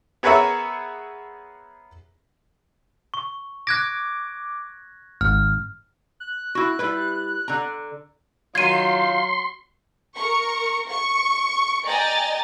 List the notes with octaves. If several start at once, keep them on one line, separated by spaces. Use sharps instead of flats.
B3 G#4 A#4 B4 C#5 E5
C#6
D6 F#6 G#6 A#6
G#1 F6
F#6
E4 F#4
G3 E4 B4
D3 A#5
D#3 F#3 F4 C6 G#6 D#7
A#4 C#6
C#6
D5 D#5 G5 G#5 A#5 A6